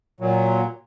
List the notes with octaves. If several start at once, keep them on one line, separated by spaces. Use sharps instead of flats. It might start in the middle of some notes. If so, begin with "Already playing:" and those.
A#2 F#3